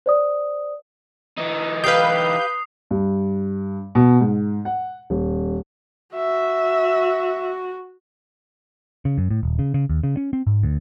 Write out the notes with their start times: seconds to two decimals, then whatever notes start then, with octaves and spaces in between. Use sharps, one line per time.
0.06 C5 D5 D#6
1.38 E3 D#4
1.84 G4 B4 F5 D#6 G6 C7
2.91 G2
3.95 B2
4.21 G#2
4.65 F#5
5.10 D#1
6.15 F#4 E5
9.05 C#3
9.18 F#2
9.31 A2
9.43 D#1
9.59 C#3
9.74 C#3
9.89 D#2
10.03 C#3
10.17 C#4
10.33 C4
10.47 G#2
10.63 D2